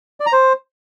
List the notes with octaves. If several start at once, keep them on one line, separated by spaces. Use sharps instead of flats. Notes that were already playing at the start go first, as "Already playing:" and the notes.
D5
A#5
C5